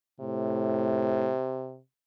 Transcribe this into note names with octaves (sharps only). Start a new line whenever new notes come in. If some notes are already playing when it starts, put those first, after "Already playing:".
A2 C3